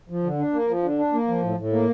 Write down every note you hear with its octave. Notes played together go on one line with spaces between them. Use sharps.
F3
D3
D4
A#3
F3
D3
D4
A#3
F3
A2
A2
A#3